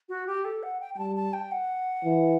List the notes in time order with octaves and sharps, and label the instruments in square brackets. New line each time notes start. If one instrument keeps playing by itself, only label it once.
[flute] F#4
G4
A4
F#5
G5
G5
[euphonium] G3 [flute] A5
[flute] A5
G5
F#5
[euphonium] E3